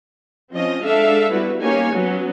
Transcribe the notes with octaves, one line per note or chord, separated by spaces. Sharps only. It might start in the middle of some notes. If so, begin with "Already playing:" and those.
F3 C4 C#4 F4 D#5
G#3 D4 A4 E5 F5
G3 B3 E4 F#4 B4
A#3 C#4 D#4 G4 C#5 G#5
F#3 B3 C#4